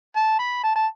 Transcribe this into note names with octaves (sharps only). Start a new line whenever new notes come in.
A5
B5
A5
A5